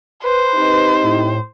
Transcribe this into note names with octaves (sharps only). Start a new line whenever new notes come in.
B4 C5
C4 D#4 G4
A2